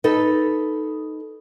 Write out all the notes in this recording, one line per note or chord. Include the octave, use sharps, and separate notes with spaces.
D#4 A4 B4